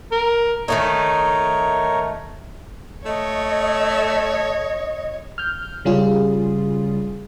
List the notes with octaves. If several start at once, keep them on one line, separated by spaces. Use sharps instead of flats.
A#4
D#3 A3 D#4 A#4 C#5
A3 C#5 D#5
F6 G6
C#3 G3 C#4 F4 G#4